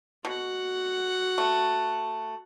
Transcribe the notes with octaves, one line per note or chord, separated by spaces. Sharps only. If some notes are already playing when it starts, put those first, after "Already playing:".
B2 F#4 F#5
A3